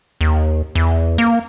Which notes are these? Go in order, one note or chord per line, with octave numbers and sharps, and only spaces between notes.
D#2
E2
A#3